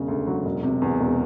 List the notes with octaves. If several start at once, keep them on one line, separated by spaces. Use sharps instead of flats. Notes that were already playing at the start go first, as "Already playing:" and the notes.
Already playing: E1 C#3
D2
F#3
E1
C3
E2
E1